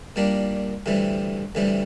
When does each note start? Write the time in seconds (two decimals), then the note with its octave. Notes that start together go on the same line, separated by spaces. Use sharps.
0.16 A#2 G3 A#3 D4
0.86 D2 C3 E3 G3
1.55 D2 C3 E3 G3